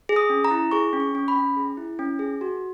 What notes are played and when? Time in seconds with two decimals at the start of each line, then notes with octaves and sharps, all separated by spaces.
0.09 G#4
0.16 D#6
0.30 C#4
0.45 A#5
0.51 E4
0.71 G#4 C#6
0.93 C#4
1.00 C#6
1.15 C#4
1.28 B5
1.36 C#4
1.57 G#4
1.77 E4
1.99 C#4
2.19 G#4
2.41 F#4